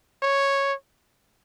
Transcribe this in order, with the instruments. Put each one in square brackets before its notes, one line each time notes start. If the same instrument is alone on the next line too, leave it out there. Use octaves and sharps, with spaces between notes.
[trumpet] C#5